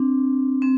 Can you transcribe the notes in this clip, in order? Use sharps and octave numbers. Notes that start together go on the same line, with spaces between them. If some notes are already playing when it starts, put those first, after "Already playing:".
Already playing: C4 D4
C4